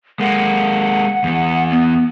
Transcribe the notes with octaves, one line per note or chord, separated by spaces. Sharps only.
G#3 A#3 F#5
E2 E3
B3